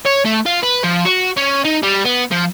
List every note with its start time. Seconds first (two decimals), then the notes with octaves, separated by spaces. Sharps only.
0.06 C#5
0.25 A3
0.46 F4
0.63 B4
0.84 F3
1.05 F#4
1.37 C#4
1.65 D#4
1.83 G3
2.05 B3
2.32 F3